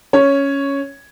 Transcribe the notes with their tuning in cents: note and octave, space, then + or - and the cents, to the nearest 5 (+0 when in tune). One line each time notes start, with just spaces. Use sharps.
C#4 +5 C#5 +0